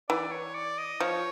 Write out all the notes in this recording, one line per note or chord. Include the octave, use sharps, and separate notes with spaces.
E3 D5
C#5
D5
D#5
F3 C#5